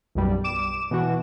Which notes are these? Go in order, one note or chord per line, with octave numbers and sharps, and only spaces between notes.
B1 F#2 B2 G3
D6 E7
B2 E3 F#4